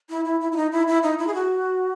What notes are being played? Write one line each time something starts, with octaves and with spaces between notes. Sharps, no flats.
E4
E4
E4
E4
D#4
E4
E4
D#4
E4
G#4
F#4